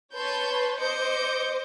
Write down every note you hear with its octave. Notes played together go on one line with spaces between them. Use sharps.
B4 C#5 A5 C6 G6
C5 D#5 D6 G6 C#7